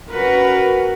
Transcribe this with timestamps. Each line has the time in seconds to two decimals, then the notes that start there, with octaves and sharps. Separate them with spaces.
0.11 C#4 F#4 A#4 B4